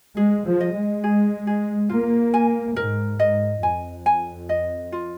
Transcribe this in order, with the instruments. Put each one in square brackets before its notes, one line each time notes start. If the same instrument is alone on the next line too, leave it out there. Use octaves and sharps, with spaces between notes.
[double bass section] G#3 [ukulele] G#4
[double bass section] F3
[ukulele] D#5
[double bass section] G#3
[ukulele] G#4
G#4
[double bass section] A#3 [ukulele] F4
[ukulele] G#5
[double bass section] G#2 [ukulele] A#4
[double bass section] G#2 [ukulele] D#5
[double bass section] F2 [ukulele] G#5
[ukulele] G#5
D#5
F4